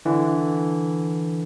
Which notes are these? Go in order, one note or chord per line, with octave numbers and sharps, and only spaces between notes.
D3 E3